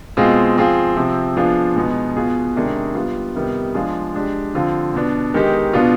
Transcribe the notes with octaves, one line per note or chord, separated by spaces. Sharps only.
B2 G#3 C4 F4 G#4
F3 C4 F4 G#4
C3 F3 C4
F3 B3 D4 F4 G#4
B2 G#3 B3 D#4 G#4
B2 B3 F4 G#4
C3 D#3 G#3 D4 G#4
G3 B3 F4
C3 D#3 G3 B3
F3 G#3 D4 F4 G#4
G#3 D4 G4
D3 F3 C4 F4
B2 B3 D4
D#3 G#3 B3 D#4 G4
B2 B3 D4 F4